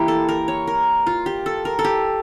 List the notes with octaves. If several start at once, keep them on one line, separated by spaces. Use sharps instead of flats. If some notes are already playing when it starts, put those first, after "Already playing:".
Already playing: E3 A#3 E4 G4
A4
A#4
C#5
A#4
F4
G4
A4
A#4
A4
G4